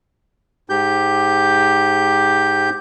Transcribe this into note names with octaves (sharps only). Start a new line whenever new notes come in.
G#2 G4 G6